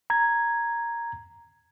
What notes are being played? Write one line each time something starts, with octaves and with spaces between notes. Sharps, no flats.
A#5 G#6